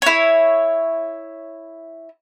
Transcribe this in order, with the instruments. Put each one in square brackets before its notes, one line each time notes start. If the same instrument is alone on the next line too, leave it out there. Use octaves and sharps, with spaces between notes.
[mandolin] E4 C#5